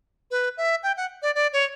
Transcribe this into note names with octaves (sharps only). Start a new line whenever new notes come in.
B4
E5
G5
F#5
D5
D5
C#5